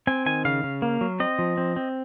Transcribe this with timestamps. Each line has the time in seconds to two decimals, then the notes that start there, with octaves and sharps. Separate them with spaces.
0.07 C4 G#5
0.26 D#3 G#5
0.45 C#3 F5
0.64 C#3
0.82 A#3
1.01 F#3
1.20 C4 D#5
1.39 F3
1.57 C4
1.76 C4